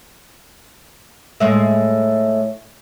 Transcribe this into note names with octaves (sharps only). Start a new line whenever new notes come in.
A2 G#3 E5